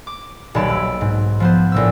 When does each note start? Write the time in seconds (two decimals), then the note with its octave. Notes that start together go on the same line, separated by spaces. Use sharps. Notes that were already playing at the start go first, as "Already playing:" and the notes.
0.07 D6
0.54 D#1 B1 C#5 A5 B5 D7
0.69 E6 B6
1.01 G#2
1.40 F3 B3 C5
1.72 A#1 A2 E6